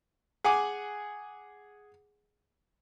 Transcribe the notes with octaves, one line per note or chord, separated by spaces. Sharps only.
G#4 F#5 G#5 D6